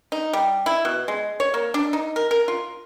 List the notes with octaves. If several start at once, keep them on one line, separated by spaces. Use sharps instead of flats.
D#4
G3
E4
B2
G#3
C#5
A#3
D4
D#4
A#4
A#4
F4